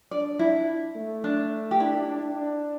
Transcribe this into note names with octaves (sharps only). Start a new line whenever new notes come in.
D4 D5
E4
A3
D4
G4
D4 E4
D4
D4